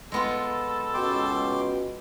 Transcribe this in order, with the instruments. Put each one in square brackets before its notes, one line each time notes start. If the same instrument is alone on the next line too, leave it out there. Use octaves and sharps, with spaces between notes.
[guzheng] G#3 B3 F4 [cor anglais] A4
[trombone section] C#2 B2 [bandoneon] G5 C6 D6